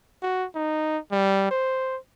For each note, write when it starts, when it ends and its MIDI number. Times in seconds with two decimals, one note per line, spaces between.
0.23 0.46 66
0.55 0.98 63
1.12 1.50 55
1.51 1.98 72